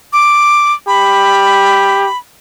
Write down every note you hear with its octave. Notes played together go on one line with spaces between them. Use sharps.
D6
G4 B5